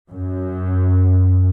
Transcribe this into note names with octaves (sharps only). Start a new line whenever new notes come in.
F#2